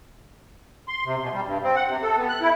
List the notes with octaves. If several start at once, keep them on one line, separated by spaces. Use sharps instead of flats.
C6
C3
B2
G3
G2
C4
F#5
C3
A4
B3
F#6
E4